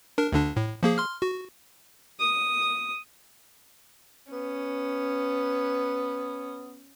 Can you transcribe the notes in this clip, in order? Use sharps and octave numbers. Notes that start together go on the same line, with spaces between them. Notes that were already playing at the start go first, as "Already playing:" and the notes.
D4 A#4
D2 D3 D4
A2
F3 A#3 G#4
C6 F6
F#4
D#6
B3 C#4